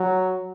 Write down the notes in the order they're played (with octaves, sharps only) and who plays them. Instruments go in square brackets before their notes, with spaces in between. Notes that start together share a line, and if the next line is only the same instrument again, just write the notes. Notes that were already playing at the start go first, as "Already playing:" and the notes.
Already playing: [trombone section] F#3